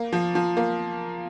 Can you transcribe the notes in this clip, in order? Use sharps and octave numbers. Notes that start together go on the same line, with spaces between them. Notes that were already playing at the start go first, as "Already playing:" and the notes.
Already playing: A#3
F3
F3
A#3